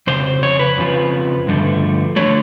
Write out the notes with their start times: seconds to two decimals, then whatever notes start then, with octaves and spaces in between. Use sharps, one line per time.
0.07 F2 C#3 C5
0.43 C#5
0.59 B4
0.77 F2 C#3 F3
1.47 G2 D3 F3 A3
2.16 D3 F3 A3 C#5